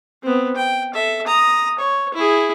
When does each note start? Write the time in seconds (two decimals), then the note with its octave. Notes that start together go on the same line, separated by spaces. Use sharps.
0.23 B3 C4
0.56 G5
0.94 A4 E5
1.27 A#5 D#6
1.79 C#5
2.14 E4 G#4